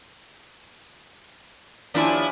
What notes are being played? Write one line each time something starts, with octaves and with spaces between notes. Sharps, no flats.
D#2 F3 D4 E4 G#5